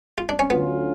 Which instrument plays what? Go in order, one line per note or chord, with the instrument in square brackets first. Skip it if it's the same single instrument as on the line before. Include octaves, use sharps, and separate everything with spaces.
[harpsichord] F4
D4
C#4
[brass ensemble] D2 D3 F#3 C#4 F4 [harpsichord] B3